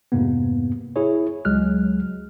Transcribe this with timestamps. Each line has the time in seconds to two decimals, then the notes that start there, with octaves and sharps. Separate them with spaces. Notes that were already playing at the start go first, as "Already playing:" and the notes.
0.12 F2 G#2 C3 A#3 B3
0.96 E4 G#4 C#5
1.45 C#2 F#3 G#3 F6 F#6